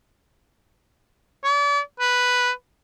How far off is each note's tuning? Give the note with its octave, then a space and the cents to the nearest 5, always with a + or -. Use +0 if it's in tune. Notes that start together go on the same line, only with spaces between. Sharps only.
D5 -40
B4 +0